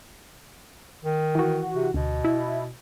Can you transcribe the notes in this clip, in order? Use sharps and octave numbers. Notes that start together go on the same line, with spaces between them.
D#3
E3 F#4
C3
D2 B2
E4